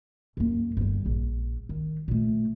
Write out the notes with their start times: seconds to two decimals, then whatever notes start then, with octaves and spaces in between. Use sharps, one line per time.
0.37 F#2 A#3
0.77 G1 G3
1.06 A#1
1.69 D#3
2.08 A#2 A3